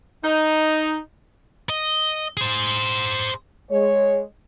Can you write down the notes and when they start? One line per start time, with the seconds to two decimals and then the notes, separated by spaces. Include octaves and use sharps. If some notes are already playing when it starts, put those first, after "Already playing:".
0.24 D#4
1.69 D#5
2.37 G#4 C5
3.69 G#3 C#5